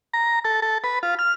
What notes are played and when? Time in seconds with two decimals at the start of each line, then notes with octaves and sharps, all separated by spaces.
0.13 A#5
0.45 A4
0.62 A4
0.84 B4
1.03 F4
1.19 F6